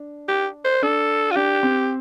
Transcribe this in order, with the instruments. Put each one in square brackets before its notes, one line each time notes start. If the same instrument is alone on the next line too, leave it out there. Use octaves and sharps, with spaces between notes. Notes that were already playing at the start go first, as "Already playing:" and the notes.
Already playing: [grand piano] D4
[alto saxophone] G4
C5
[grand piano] D4 [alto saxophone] A4
[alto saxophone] F4
[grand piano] D4 [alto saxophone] G4
[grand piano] C4